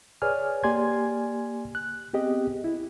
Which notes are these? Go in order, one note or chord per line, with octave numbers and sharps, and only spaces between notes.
G#4 B4 C#5 D5 G#5 F6
A#3 G4 D5 G#5 C6 G#6
F#6
B3 C4 G4 G#4 D#5
E4